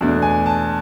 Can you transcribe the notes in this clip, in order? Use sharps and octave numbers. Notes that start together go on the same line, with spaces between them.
E2 B2 A3 D4
G#5
A5